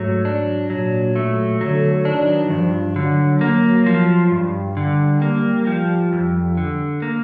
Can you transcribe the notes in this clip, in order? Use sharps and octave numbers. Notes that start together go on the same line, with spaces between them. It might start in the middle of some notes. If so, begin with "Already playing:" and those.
Already playing: G#2 F#3 A3
D4
A#2 F#3
A3
D3 F#3
D#3 D4
G2 F3
D3 F#3
A#3
F3
G2 G3
D3
A#3
F3
F2
D3
A#3